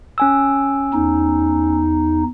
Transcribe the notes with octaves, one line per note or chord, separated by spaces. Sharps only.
C#4 G#5 E6
E2 D#4